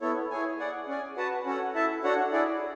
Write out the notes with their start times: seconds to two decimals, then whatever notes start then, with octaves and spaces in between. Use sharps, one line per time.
0.01 B3 E4 A4 C#5
0.31 E4 G#4 C#5 G#5
0.59 G#4 D5 F#5
0.88 C#4 G#4 D5 G#5
1.17 F#4 B4 F#5 A5
1.46 C#4 F#4 A4 C#5 F#5
1.74 E4 A4 E5 A5
2.04 D4 F#4 A4 C#5 F#5
2.32 E4 G#4 D5